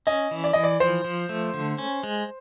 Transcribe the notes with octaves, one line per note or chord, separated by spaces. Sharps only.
C#4 D#5
E3
D5
E3 D#5
D5
F3 C5
F3
A3
D3
C#4
G#3